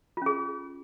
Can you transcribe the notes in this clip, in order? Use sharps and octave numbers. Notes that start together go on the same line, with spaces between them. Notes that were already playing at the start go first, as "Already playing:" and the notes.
C#4 F4 G#4